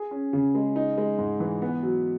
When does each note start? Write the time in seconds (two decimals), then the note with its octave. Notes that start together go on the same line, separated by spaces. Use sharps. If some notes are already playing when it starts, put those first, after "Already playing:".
Already playing: G#4
0.11 C#4
0.33 C#3
0.55 G#3
0.76 D#4
0.98 G#3
1.19 G#2
1.40 E3
1.62 B3
1.83 F#3